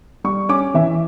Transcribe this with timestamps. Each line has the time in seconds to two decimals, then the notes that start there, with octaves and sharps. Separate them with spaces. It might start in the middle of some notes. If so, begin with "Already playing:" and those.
0.24 G3 C#6
0.49 C#4 D6
0.74 E3 E5